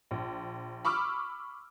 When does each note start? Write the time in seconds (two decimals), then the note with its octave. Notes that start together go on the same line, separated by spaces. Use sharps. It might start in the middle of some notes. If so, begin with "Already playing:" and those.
0.11 A#1
0.85 B5 C#6 D6 E6 F6